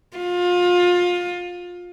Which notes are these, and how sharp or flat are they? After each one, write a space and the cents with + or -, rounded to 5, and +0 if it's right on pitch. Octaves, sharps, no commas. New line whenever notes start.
F4 +25